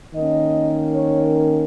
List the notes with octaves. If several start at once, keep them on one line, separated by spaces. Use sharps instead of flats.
D#3 A#3 C#4 D#5
C#5